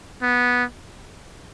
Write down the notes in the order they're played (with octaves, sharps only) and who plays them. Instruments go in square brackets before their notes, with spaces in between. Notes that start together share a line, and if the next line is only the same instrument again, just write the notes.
[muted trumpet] B3